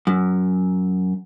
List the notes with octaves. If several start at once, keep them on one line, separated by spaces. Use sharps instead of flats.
F#2